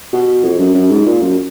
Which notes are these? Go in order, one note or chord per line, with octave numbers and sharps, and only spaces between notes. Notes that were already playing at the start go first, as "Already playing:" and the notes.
B2
F2
F#2
F#2
G#2
A#2
F#2